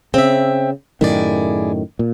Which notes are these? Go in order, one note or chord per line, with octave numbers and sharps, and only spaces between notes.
C#3 C4 E5
F#2 A2 D#3 E4 G#4 D5
A#2